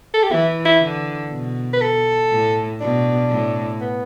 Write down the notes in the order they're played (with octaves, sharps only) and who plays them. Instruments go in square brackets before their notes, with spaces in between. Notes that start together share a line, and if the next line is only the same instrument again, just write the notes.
[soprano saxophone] A4
G4
[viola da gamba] E3 [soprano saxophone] E4
[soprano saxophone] E4
[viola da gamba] D3
B2
[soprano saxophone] B4
A4
[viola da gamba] A2
[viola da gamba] B2 [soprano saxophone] D4
[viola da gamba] A2
[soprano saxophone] B3